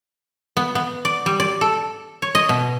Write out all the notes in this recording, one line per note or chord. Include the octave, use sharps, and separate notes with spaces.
B3
B3
D5
G3
D5
A4
C#5
D#5
B2